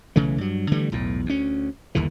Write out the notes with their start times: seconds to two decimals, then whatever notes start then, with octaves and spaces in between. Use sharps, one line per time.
0.16 B1 C#3 E3 A3
0.38 G2 F#3
0.72 D3 E3 G3 A3
0.92 B1 E2 A2
1.26 D2 C#4
1.95 G1 D#2 D3 E3